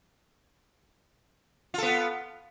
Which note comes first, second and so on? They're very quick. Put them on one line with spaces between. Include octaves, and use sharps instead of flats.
F4 A4 B3